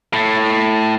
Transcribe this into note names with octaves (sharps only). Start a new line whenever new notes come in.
A2